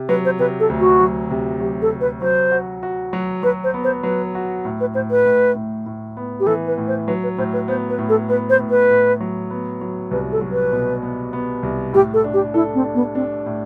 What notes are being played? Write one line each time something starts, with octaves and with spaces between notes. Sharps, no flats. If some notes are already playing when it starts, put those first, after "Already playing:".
Already playing: C3
F#3 B4
C5
C3 B4
A4
D2
F#4
F#3
C3
F#3 G4
A4
C3
B4
F#3 C5
F#4
F#4
F#3
F#3 B4
C5
B3
C5
F#3 B4
F#4
A2
B4
A2 C5
B4
A2
A2
A2
B3
G4
E3 A4
B4
A2
C5
F#3 B4
B4
A2 C5
B4
B3 C5
B4
A2
A4
B3 B4
C5
A2
B4
A2
F#3
B3
F#3
C2 B4
A4
F#3
B4
B2
B3
B3
C2
A2 G4
A4
D4
G4
E4 A4
C4
D4
B3
C4 D4
A2